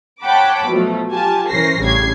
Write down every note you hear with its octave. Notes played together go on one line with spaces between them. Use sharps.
C#5 F#5 G5 A5 B5 D6
B2 F3 F#3 A3
F4 G4 G#5 A5
E3 C#4 A#4 C5 A#6 C7
A1 C#3 G3 D4 G#6 C7